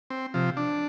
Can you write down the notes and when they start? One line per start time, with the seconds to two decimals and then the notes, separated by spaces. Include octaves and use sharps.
0.10 C4
0.34 C3 F3
0.57 D4